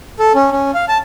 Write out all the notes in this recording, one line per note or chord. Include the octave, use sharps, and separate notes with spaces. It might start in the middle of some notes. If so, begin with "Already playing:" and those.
A4
C#4
C#4
F5
A5